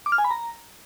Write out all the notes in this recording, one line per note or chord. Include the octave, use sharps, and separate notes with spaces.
D6
F6
G#5
B5
A#5